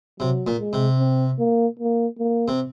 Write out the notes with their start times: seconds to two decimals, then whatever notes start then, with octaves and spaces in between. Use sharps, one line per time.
0.19 C3 F#3
0.47 A#2
0.59 G#3
0.73 C3
0.99 C4
1.39 A#3
1.79 A#3
2.19 A#3
2.48 C3